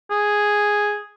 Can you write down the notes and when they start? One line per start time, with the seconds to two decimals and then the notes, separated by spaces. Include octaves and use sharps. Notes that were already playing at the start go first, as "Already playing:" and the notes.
0.11 G#4